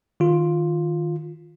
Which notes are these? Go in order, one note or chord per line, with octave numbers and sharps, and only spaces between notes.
D#3 F4